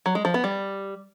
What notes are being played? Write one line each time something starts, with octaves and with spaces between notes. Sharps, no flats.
F#3
G#3
F3
B3
G3